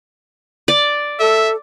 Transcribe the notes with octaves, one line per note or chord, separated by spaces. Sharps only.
D5
A4 E5